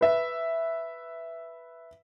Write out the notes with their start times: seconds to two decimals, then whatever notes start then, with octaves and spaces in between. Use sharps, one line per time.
0.01 B4 E5